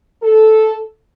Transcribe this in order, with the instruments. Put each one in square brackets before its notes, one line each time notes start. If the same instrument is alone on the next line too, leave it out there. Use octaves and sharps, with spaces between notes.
[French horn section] A4